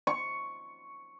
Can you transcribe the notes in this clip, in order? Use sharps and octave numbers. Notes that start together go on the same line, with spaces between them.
C#6